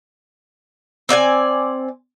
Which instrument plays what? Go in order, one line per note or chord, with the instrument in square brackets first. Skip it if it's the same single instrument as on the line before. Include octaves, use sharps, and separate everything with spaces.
[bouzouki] C4 D5 F#5 G#5